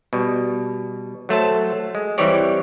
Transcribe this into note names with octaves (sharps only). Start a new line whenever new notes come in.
B2 G3
F#3 A3 C5 A5
G#3
E3 G3 C4 G4 C#5 D5